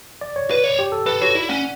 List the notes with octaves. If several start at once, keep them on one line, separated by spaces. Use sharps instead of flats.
D5
C#5
B4
C#5
G4
A4
A4 B4
F#4 C#5
E4 D5
C#4 F#5